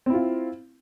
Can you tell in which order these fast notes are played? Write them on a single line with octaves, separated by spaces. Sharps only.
C4 E4 F4